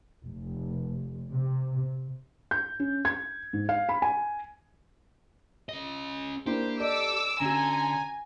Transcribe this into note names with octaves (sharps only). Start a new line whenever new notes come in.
F1
C3
G6
C#4
G#6
G#2
F5
B5
G#5
C#4 D#5
A#3 D4 E4 G4 C5
A4 D5 D#5 D6 E6
D3 C#4 F#4 G#5 A#5